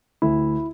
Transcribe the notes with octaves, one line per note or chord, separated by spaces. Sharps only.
D2 E4